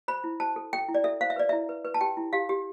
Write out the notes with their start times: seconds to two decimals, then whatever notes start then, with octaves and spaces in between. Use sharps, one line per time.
0.08 C5 B5
0.24 E4
0.40 C5 A5
0.56 A4
0.73 A4 G5
0.88 E4
0.95 D5
1.04 A4 E5
1.21 C5 F5
1.30 E5
1.36 B4 D5
1.49 E4 E5
1.69 B4
1.85 B4
1.94 A5
2.01 G4 G5
2.17 E4
2.33 G4 F5
2.49 G4